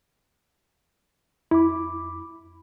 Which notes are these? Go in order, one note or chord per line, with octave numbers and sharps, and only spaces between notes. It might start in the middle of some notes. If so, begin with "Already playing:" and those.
F2 E4 B5 D6